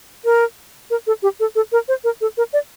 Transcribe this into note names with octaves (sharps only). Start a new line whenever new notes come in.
A#4
A#4
A4
G4
A4
A4
A#4
C5
A#4
A4
A#4
D5